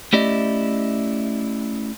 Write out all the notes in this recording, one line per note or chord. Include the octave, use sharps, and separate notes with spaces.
A3 C#4 E4 G4 D5 D#5